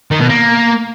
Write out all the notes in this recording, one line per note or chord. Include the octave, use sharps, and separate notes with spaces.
D#3
B2
A#3